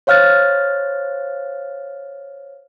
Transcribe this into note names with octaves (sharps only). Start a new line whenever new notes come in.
C5 C#5 F5 F6 F#6 A6